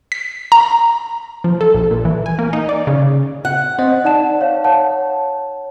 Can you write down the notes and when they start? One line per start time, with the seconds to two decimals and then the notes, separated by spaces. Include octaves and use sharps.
0.12 B6
0.52 A#5
1.44 F3
1.61 A4
1.74 A#1
1.91 A#2
2.05 E3
2.26 G#5
2.39 A#3
2.53 D#4
2.69 D5
2.87 C#3
3.45 F#5
3.79 C4 C5 D#5
4.04 D#4 D5 F#5 A5 E7
4.41 C#5 F5
4.64 C#5 F#5 A5